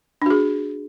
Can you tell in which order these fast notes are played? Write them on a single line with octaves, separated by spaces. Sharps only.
D4 F#4 G#4